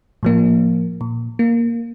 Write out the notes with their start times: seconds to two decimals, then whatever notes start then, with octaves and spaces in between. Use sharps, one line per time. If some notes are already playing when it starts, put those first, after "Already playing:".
0.23 A2 F3 A#3
1.01 A#2
1.39 A#3